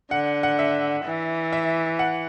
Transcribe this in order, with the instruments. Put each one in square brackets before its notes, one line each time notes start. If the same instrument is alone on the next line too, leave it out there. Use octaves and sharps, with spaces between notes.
[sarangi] D3 [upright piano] F#5
[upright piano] F#5
E5
[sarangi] E3
[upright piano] E5
F#5